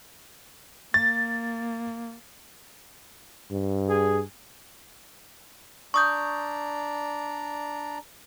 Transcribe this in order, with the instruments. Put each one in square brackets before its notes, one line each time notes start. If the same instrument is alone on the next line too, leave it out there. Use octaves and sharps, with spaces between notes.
[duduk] A#3 [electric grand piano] A6
[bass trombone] G2
[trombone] G#4
[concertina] D4 D5 A#5 [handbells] C#6 D#6 G6